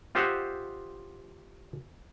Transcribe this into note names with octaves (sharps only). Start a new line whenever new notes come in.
F4 G4 C5 D#5 E5 F#5